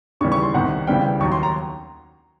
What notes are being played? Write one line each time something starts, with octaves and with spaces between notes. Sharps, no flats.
D#2 C#3 E3 G3 C#6
C#6
C6
C2 C3 D#3 F#5
C#2 C#3 E3 G3 C4 G5
D#2 D#3 F#3 C#6
C6
A#5